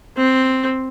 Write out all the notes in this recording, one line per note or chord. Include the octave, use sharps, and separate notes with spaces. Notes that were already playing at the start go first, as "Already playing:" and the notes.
C4